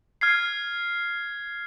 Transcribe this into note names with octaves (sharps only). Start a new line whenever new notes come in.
F6 G#6 C7